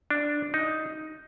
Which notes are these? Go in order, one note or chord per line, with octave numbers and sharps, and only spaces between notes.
D4
D#4